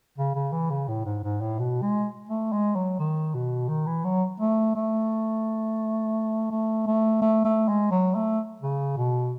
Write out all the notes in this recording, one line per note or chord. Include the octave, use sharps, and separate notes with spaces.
C#3
C#3
E3
C#3
A2
G#2
G#2
A2
B2
G#3
A3
G#3
F#3
D#3
B2
D#3
E3
F#3
A3
A3
A3
A3
A3
A3
G#3
F#3
A3
C#3
B2